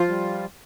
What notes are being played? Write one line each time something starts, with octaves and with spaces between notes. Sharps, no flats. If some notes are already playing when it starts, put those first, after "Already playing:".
Already playing: F3 F4
G3